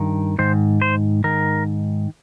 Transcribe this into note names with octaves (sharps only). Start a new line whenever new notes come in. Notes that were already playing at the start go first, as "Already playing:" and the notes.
Already playing: G2 D#3
G#2 D#3 C5
C5
G#2 D#3 A#4